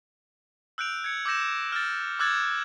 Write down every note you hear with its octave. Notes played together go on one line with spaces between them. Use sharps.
E6 F#6 G6 D7 F7
G#6 C#7
D6 E6 G6 A#6 E7
F6 A6
D6 E6 F#6 G#6 A6